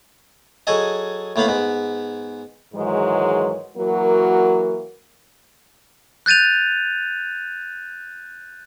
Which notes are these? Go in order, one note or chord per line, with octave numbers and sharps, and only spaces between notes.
F#3 G#4 A4 D#5
A2 A#3 B3 F5 B5
G#2 B3
G#2 D#3 E3 F#3 G#3
E3 F#3 A#3 F#4 A#4
F#6 G6 A6 D#7 F7